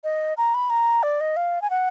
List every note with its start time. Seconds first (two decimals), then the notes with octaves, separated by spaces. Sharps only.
0.04 D#5
0.37 A#5
0.54 B5
0.70 A#5
1.03 D5
1.21 D#5
1.37 F5
1.62 G#5
1.70 F#5